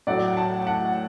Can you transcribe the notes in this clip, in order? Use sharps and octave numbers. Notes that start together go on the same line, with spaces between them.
A2 F#3 A3 D5 F#5
F#5 A5
F#5 A5